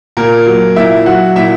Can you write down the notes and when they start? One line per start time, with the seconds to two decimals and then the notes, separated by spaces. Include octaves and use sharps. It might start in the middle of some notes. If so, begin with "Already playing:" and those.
0.17 A#2 A#3 A#4
0.46 F#3
0.76 A#2 E4 E5
1.06 F#3 F#4 F#5
1.36 A#2 E4 E5